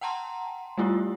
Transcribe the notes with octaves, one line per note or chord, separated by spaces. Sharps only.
F#5 G5 A5 A#5 C6
G3 A3 E4 F4 G4